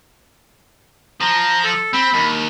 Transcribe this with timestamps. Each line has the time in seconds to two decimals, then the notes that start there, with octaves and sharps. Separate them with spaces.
1.21 F3 A#5
1.64 A4
1.93 C4 B5
2.14 D#2